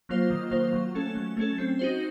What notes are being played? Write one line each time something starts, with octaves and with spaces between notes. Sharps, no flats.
F#3 A#3 F4 C5
D#3
F#3 A#3 F4 C5
F#3
A3 C#4 A4
F#3
A3 C#4 A4
C4
D#4 F#4 C5